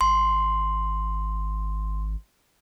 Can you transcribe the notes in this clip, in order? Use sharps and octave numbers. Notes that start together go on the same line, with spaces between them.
G#1 C6